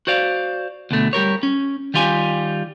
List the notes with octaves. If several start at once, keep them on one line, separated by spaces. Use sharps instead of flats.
F#4 C5 D5 F5
D2 B2 A3
G3 G4 A#4 C#5
C#4
D#3 G3 F4 G4 G#5